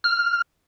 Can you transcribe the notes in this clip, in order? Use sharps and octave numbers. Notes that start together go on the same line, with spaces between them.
F6